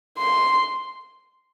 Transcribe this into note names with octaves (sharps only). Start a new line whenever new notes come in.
C6